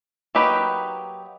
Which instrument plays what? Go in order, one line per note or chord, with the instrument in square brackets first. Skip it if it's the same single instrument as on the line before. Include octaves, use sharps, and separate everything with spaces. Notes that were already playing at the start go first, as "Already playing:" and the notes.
[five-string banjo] F#3 A#3 D#4 G4 B4